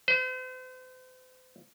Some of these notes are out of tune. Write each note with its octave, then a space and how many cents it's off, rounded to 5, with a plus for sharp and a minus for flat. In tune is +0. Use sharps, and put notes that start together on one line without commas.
C5 -40